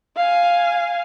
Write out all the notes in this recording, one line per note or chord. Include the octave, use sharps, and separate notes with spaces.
F5 G#5